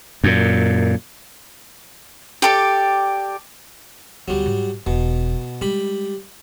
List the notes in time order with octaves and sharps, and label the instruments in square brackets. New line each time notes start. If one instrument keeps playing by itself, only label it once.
[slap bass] F#2 A#2
[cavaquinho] G4 A4 D5
[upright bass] D2 B3 [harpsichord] F#3 G3
[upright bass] G#2
[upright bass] E1 [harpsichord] B2
[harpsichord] G3 B5 [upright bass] G#3